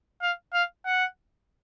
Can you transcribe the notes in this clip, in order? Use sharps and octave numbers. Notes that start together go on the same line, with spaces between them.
F5
F5
F#5